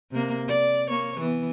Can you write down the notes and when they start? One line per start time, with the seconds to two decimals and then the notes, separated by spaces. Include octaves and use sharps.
0.11 C3 A#3
0.48 D5
0.88 A#3 C#5
1.19 E3 B3